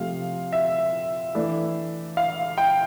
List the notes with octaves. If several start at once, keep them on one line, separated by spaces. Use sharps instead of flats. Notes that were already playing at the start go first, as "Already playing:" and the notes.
Already playing: C3 F3 A3 F5
E5
E3 A3 D4
F5
G5